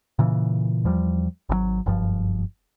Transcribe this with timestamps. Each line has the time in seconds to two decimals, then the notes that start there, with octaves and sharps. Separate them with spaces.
0.19 A#2 C#3 E3
0.85 E2 F3 G3
1.49 G#1 B2 F#3
1.86 F#1 G2 F3